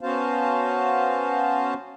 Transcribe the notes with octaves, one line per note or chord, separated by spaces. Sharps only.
B3 C#4 F#4 C5 F5 A5